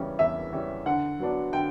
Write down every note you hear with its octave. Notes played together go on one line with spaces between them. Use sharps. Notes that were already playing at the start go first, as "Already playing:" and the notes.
Already playing: E2 C#3 E3 G3 C#4
E2 E5
C#3 E3 G3 C#4
D3 F#5
F#3 B3 D4
D3 G5